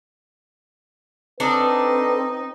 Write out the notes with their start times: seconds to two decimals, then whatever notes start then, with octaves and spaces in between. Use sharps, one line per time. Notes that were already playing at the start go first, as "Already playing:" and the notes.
1.40 C4 D4 D#4 A4 B4 D5